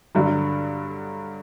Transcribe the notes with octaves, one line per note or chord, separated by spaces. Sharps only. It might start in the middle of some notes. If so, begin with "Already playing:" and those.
G2 D3 F#3